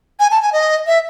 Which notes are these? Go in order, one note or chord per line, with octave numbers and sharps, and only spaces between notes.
G#5
A5
G#5
D#5
E5